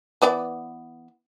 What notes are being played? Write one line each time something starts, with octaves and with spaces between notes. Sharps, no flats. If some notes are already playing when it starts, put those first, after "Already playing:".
E3 B3 D5